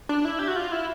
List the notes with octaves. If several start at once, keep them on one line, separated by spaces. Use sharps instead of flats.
D4
E4
G4
F#4
F4
E4